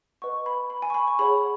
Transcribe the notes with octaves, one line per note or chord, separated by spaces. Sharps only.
B4 D#5 F#5 C#6
B5
B5
G#5
C#6
B5
C#6
G#4 C#5 F#5 B5